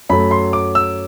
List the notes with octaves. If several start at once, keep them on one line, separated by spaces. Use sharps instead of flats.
F#2 F#3 A3 B5
C6
D6
E6